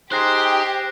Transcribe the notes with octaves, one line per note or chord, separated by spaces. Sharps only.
D#4 G4 G#4 C5 F#6 A#6 C7